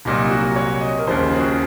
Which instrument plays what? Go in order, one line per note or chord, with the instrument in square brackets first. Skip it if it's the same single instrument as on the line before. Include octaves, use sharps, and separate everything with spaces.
[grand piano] C2 A#2 F#3 D#4
F#4
C#5
D#5
A#4
D#2 C#3 F3 C5
G#4
F#4
G#4